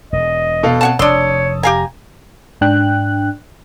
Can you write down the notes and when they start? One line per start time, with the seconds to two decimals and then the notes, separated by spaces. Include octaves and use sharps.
0.12 E1 D#5
0.63 B2 A4 F5
0.81 C4 C#5 F#5 A5
0.99 F1 D4 C#5 A5 C6 D#6 E6
1.63 G4 F5 G#5 A#5
2.61 G#2 D4 G5 F#6